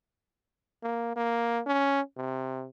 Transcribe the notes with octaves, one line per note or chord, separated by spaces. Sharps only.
A#3
A#3
C#4
C3